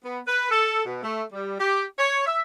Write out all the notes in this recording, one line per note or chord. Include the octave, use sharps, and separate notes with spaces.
B3
B4
A4
B2
A3
G3
G4
C#5
E5